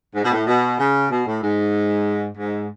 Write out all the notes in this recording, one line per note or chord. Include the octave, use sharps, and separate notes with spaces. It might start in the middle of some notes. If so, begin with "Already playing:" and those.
G#2
B2
A2
B2
C#3
B2
A2
G#2
G#2